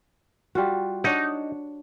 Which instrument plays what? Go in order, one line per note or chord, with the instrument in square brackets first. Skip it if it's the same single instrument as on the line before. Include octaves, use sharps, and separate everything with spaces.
[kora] G3 F4 F#4
[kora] D4 C#5 F#5 [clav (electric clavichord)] D#4